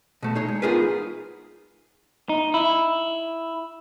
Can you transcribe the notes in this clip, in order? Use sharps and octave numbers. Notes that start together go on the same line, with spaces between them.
B2 A3 A5
D#4 G#4 C#5
G#3
B3 D#4 F4 G#4 A#4 B4
D#4
E4